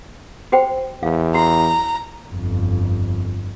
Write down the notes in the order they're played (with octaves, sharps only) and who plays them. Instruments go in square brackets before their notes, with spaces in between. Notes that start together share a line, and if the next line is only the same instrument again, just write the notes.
[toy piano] F#4 C5 G5
[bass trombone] E2 [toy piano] F5
[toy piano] F#4 [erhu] A#5
[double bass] G1 F2